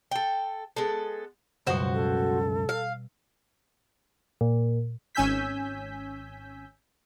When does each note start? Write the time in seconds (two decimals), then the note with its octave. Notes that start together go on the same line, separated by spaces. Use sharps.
0.11 A4 G5
0.76 G#3 B3 A4
1.67 C#2 F#2 B2 G3 F#4 C5 F#5
1.94 A4
2.69 F5
4.41 A#2
5.15 G#1 C#4 G#5 E6 G6 B6